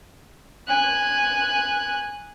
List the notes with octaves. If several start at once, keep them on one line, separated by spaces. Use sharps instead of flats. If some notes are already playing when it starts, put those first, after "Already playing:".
G#5 F#6